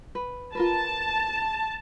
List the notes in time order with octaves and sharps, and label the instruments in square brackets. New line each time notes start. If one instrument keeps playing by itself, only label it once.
[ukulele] B4
[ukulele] F4 A#4 B4 [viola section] A5